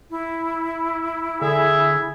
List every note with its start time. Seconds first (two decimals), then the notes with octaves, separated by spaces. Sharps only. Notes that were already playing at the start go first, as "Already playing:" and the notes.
0.10 E4
1.42 D3 G#4 E5